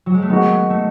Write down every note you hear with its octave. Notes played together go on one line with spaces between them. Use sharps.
F#3
G#3
A3
D#3 G#3 B3 D#4 F#4
A3